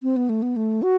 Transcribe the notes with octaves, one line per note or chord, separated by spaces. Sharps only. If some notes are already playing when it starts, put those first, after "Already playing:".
C4
B3
A3
B3
A3
F#4